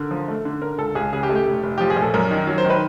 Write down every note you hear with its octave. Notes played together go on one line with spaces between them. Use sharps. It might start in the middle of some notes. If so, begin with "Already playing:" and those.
Already playing: D3 A#4
F3
A3
D3
D3 A#4
C#2 A4
C#2 G#4
C#3 G#4
G4
A3 G#4
G4
F1
F1
F3 G4
G#4
A#1
A4
F#2 A#4
D#3
F#3
C5
D#3
B4